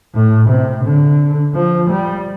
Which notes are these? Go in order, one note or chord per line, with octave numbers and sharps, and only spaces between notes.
A2
C3
D3
F3
G3